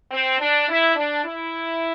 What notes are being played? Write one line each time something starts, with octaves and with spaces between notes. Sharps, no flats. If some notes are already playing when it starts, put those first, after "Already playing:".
C4
D4
E4
D4
E4